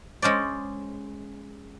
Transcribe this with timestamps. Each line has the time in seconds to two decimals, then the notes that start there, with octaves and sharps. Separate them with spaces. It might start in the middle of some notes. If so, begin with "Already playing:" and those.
0.22 G#3 C#4 C5 D5